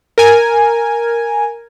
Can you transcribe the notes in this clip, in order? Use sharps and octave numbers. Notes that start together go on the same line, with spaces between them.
A#4 G#5